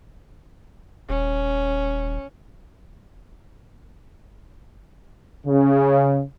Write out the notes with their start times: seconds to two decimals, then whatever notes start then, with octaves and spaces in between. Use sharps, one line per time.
1.09 D#1 C#4
5.46 C#3